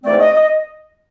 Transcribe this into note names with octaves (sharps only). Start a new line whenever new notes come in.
G#2 E3 A3 C4 D5
D#5
D#5